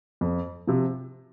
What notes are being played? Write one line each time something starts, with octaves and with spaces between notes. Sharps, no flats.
F2
C3 F3